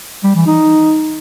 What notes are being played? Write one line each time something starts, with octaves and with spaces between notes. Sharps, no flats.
G3
E3
D#4